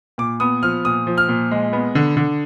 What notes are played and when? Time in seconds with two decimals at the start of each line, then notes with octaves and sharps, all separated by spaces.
0.18 A#2 D6
0.40 B3 D#6
0.63 F3 F6
0.85 A#2 D#6
1.07 F3
1.18 F6
1.29 A#2
1.51 G#3
1.73 B3
1.95 D3
2.17 D3